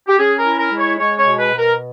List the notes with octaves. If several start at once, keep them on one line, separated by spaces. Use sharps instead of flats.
G4
C#4 G#4
A#4
E4
A#4
G#3
C#5
G#3 C#5
C#5
B2
B4
B2
A#4